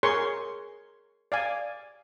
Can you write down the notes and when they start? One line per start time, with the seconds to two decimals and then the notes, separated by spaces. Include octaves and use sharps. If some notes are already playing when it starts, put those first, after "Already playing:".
0.03 G#4 A#4 C#5 C6 C#6
1.32 D5 F5 G#5